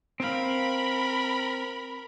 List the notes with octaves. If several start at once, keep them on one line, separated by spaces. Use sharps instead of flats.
C4 A#4 F5 B5